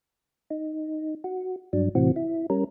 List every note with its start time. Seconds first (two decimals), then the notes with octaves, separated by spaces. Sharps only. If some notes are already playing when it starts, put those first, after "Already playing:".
0.50 D#4
1.24 F#4
1.73 G2 F#3 D4
1.95 A2 C3 E3 C4 F#4
2.16 E4
2.50 G3 C#4 A#4